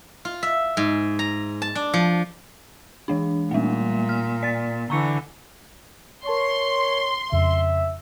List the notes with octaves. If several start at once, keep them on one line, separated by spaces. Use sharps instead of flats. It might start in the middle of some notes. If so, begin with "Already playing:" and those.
F4
E5
G#2
A#5
A5
D4
F3
E3 G#3 D4
A#2 G3 A3
F6
D5 A6
D3 E3 A#5 C#6 C#7
A#4 C#5 A5 C6 C#6
F2 C#3 E5